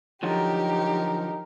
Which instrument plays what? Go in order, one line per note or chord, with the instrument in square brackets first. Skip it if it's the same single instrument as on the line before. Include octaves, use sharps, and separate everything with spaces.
[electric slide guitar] D3 F3 F#3 [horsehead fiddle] D#4 A#4 [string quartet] G4